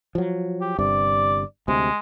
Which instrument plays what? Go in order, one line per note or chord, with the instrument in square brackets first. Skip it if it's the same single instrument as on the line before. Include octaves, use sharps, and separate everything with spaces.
[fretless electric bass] F3 F#3
[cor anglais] G4
[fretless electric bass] G1 G2 C3 [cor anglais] D5
[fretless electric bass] D2 C3 [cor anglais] G#3